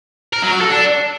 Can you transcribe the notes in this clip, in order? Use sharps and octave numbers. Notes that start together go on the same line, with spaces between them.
A#4
F#3
F#4
A4
D4